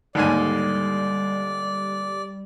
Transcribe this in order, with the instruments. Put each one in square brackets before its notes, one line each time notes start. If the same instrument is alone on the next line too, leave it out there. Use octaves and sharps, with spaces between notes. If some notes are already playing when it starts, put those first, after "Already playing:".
[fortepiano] D#2 G#2 G#5 [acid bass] D3 [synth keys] G3 [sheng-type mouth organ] D5